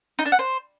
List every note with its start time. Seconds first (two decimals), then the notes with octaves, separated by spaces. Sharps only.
0.19 D#4
0.25 D4
0.32 F#5
0.39 C5